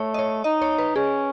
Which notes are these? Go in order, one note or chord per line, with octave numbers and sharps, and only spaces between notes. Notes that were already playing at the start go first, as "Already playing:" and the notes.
Already playing: A3 C#5
D#5
C#5
D#4 D#5
C#5
B4
C#4 G#4